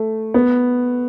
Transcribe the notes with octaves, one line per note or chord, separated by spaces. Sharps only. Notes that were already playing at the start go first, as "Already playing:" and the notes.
Already playing: A3
B3